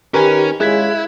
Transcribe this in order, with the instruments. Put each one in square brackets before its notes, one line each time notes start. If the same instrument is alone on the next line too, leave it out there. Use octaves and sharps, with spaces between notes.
[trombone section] D#3 [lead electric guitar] C#4 [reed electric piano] G4 [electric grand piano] A#4 B4 G#5
[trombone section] G#3 C#4 F4 [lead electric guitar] E4 [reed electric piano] G#4 [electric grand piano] F#6 G#6 B6